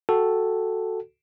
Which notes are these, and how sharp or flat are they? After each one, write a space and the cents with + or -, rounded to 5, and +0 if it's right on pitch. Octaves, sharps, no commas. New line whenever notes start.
F#4 +0 A4 +0 G5 +0